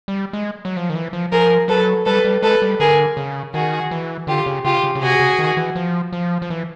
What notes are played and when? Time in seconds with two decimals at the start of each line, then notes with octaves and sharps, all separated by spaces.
0.08 G3
0.33 G#3
0.65 F#3
0.76 F3
0.90 D#3
0.95 E3
1.13 F3
1.31 F3 G#4 A#4
1.68 F#3 A4 B4
2.05 G3 A4 B4
2.25 G3
2.42 G#3 A4 B4
2.62 G3
2.80 D3 G#4 A#4
3.17 C#3
3.54 D#3 F#4 G#4
3.91 E3
4.27 D3 F4 G4
4.46 C#3
4.65 C#3 F4 G4
4.83 C#3
4.95 C#3
5.02 C3 F#4 G#4
5.20 C#3
5.39 D#3
5.57 E3
5.76 F3
6.13 F3
6.42 F3
6.50 E3